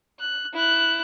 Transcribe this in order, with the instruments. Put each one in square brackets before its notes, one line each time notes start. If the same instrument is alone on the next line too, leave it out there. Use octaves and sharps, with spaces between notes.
[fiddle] F#6
E4 F#6